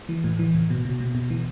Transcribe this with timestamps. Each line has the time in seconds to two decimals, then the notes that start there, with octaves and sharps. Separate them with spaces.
0.09 E3
0.24 A2
0.39 E3
0.54 A2
0.70 B2
0.85 B2
1.00 B2
1.15 B2
1.30 E3